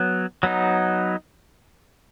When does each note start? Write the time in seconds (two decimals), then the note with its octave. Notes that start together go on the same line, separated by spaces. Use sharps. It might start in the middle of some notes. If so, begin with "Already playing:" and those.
Already playing: F#3 B3
0.43 F#3 B3 D#4